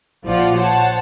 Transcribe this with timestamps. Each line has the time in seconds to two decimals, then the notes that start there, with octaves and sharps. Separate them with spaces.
0.25 A#1 F3 F4 D5 F#5
0.57 C5 C#5 F#5 A5